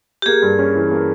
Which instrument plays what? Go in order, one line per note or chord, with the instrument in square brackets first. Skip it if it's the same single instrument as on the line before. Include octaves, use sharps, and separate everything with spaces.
[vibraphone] G4
[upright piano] A#3 [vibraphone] G#4
[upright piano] G2
C#4
E3
A#3